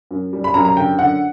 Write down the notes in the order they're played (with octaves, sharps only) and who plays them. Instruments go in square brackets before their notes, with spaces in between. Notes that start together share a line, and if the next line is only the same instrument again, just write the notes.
[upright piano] F#2
G3
B5
F#2 A#5
A#5
D3 G5
D3 F#5